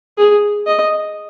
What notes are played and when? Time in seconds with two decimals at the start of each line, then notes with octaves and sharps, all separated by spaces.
0.18 G#4
0.67 D#5